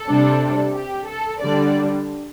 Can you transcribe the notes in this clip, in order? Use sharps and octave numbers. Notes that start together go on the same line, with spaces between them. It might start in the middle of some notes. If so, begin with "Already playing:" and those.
Already playing: A4
C3 G3 D4
G4
A4
D3 G3 D4 D5